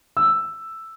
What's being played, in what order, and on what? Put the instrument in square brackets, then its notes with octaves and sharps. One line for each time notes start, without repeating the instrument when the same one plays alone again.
[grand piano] E6